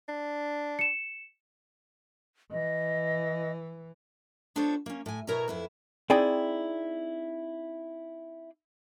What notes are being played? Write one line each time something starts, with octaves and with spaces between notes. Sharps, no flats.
D4
C#7 E7
E3 D#5
B3 D4 F4 A4 C5 C#5
A#3 C#4
A2 G#5
B2 E4 A#4 C#5 E5 A#5
F2 E4 B4
C4 D#4 E4 G#4 D5 G5